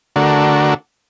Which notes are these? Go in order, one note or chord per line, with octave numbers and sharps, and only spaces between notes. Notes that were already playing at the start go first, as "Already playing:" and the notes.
D3 A3 D4 F#4 A#4